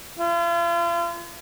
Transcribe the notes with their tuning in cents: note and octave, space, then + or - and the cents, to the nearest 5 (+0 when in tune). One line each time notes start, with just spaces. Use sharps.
F4 -40